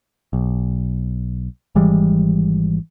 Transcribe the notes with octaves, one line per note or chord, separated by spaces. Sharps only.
B1
G#1 E3 G3 G#3